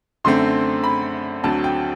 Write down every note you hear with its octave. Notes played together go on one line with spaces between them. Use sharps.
F#2 D3 A3 C4 C6
B5
D2 D3 F#3 C4 A5
G5